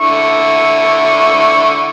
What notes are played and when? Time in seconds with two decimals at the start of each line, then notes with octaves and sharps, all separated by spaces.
0.01 D3 E4 C#6